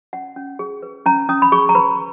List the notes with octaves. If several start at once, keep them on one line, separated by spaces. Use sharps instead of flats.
C#4 F#5
C#4
G#4
B4
C#4 A#5
C#4 D#6
B5
G#4 C#6
A#5
B4 B5